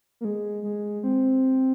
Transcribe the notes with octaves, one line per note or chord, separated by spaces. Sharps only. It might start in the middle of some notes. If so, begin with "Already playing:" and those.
A#3
G#3
G#3
C4